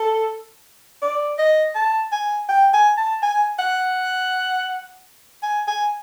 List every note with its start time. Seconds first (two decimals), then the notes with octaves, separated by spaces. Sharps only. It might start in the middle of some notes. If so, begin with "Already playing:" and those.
Already playing: A4
1.02 D5
1.39 D#5
1.75 A5
2.12 G#5
2.49 G5
2.73 G#5
2.98 A5
3.23 G#5
3.59 F#5
5.43 G#5
5.68 G#5